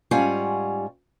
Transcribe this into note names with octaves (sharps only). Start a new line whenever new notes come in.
G#2 G3 C#4 F4 F#5 G#5